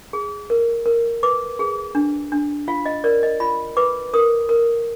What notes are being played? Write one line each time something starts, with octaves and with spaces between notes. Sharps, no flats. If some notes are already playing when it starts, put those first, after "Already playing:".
G#4
A#4
A#4
B4 D6
G#4
D4
D4
F4 F5
D#5
A#4 D5
D#5
F4 B5
B4 D6
A#4 D#6
A#4